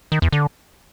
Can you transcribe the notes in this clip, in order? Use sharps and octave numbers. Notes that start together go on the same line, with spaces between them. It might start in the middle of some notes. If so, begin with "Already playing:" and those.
D#3
E2
D3